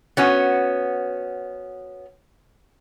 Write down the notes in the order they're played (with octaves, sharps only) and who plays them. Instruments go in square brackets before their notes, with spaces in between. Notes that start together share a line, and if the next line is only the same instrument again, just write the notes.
[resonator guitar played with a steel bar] B3 C#4 F#4